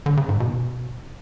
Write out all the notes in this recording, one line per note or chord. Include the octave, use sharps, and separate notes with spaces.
D3
C#3
G#2
B2